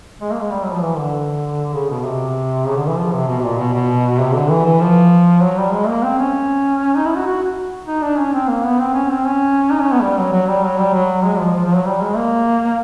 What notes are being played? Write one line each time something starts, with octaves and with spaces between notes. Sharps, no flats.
G#3
A#3
G#3
G3
F#3
F3
E3
D3
C#3
B2
C3
C#3
D3
E3
F3
C3
B2
A#2
B2
B2
C3
D3
E3
E3
F3
F#3
G3
G#3
A#3
C4
C#4
D#4
E4
F#4
F#4
D#4
D4
C#4
C4
A#3
B3
C4
C#4
C4
C#4
D#4
C#4
B3
G3
F#3
F#3
G3
F#3
G3
F#3
G#3
F3
F3
F3
F#3
G3
G#3
A#3